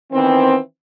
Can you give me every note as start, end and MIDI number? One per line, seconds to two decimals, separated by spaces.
0.13 0.56 51
0.13 0.56 52
0.13 0.56 59
0.13 0.56 60